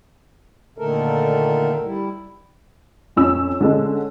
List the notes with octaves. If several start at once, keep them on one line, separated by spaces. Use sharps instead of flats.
A#2 D3 D#3 A3 A4 A#4
G3 E4
F2 C#4 E6
D3 G#3 C#4